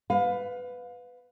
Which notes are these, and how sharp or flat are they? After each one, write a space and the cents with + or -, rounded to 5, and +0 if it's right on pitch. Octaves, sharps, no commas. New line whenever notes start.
B4 +15 F5 +30